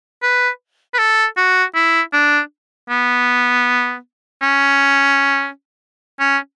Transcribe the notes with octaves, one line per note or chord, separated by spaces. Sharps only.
B4
B4
A4
F#4
E4
D4
B3
C#4
C#4